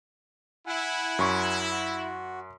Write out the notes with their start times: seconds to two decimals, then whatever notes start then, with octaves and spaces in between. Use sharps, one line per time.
0.67 E4 F#5 G#5
1.19 F#2 C6 C#6
1.71 F#4